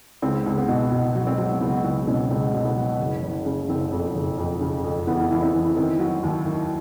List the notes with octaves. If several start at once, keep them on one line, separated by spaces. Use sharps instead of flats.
C#2 C4
C#2
B3
B2
B2
F#3
C4
F#3
C#2 B3
C#2 C4
B2 C#4
C#2 C4
B2
B3
F#3
F#1
F#1
C#3
F#1 C4
F2
F#1
F2
C#3
F2
E3 B3
E3
C4
E3
D#3 C4
F#3
D#2
D#3